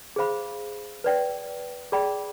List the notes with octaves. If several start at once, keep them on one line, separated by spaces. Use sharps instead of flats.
G#4 C5 F5 B5
B4 D5 G5
G#4 D5 G5 B5